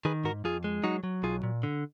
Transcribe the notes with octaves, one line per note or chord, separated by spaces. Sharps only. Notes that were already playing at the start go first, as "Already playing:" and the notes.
D#3 G#4 B4
G#2 F#4 A#4
F2 F4 G#4
G#3
F#3 D#4 F#4
F#3
B1 F4 G#4
A#2
D3